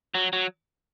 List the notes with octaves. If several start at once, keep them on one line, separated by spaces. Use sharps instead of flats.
F#3
F#3